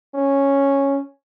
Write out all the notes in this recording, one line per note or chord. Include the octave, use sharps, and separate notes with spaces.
C#4